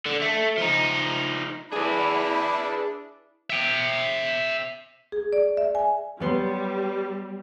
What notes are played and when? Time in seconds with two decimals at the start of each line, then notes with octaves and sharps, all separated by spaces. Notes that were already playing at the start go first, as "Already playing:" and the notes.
0.06 D3
0.22 A3
0.58 F3 D#4
1.72 D4 E4 G#4 B4
3.50 E5 G5
5.12 G#4
5.33 D5
5.57 E5
5.75 G#5
6.20 F#3 G3 B3 C6